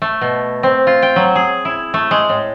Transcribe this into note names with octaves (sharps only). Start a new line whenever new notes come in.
A3
B2
C4
F4
G5
F#3
G#4
E4
A3
G#3
A2